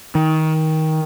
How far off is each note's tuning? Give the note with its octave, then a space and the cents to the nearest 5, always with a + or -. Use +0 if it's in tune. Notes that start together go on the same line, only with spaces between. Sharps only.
D#3 +20